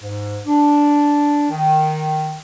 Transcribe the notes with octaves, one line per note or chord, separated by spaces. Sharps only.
G#2
D4
D#3